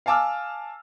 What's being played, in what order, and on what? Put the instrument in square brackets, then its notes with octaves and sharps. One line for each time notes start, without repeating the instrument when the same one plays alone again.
[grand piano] F5 G#5 A5 D6 E6 F6